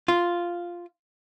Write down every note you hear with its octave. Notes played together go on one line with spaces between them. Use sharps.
F4